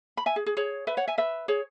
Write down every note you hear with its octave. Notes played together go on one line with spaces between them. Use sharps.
B5
E5 G#5
G#4
G#4
G#4 C#5
B4 E5
C#5 F#5
E5 G#5
B4 E5
G#4 C#5